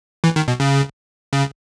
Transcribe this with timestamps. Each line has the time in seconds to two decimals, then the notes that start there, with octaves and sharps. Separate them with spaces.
0.24 E3
0.36 D#3
0.48 B2
0.60 C#3
1.33 C#3